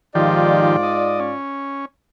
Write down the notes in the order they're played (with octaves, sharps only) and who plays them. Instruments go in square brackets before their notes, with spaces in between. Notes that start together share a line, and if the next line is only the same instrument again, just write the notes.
[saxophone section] G#2 F4 D5 [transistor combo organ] D#3 F3 G4
[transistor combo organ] D#5
C#4